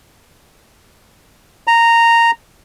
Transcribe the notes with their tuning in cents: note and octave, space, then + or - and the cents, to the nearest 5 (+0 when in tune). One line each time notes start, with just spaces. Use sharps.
A#5 -10